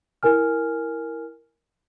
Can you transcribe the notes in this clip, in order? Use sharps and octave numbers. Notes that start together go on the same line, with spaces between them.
E4 A#4 G#5 F6